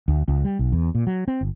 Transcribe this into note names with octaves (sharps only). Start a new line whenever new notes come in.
D2
C#2
G3
B1
E2
A#2
F#3
C4
G1